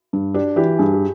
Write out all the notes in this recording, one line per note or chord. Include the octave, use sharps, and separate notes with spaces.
G2
D4 G4
E3 G4
G2 G#4
G4